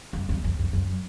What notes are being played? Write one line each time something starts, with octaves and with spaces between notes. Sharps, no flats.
F#2
E2
F2
F2
F#2